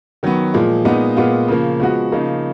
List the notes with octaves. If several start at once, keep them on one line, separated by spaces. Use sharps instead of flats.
D#3 F#3 B3
A#2 F3 G#3
A#2 G#3 B3 D#4
A#2 G#3 B3 F4
C#3 F3 A#3
F3 G#3 B3 F#4
C#3 F3 A#3 D#4